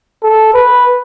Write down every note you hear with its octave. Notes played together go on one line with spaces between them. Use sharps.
A4
B4